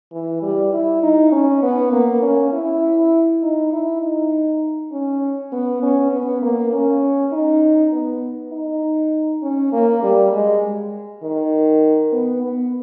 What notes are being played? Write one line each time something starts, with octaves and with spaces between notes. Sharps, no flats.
E3
G3
E4
D#4
C#4
B3
A#3
C#4
E4
D#4
E4
D#4
C#4
B3
C#4
B3
A#3
C#4
D#4
B3
D#4
C#4
A#3
G3
G#3
D#3
B3
B3